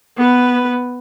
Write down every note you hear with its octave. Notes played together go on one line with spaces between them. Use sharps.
B3 B4